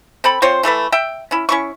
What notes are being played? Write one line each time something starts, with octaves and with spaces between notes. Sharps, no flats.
C4 A4 B5
C4 F4 C5 C#5
E3 A3 A4 B4
E5 G5
C#4 E4
C#4 E4 C#6